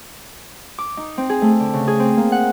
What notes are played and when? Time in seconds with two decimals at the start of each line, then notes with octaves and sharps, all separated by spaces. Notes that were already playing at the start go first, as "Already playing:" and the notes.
0.78 D6
0.97 D#4
1.18 C4
1.29 G#4
1.42 A3
1.60 D3
1.74 C#3
1.87 G#4
2.00 C4
2.17 A#3
2.32 F#5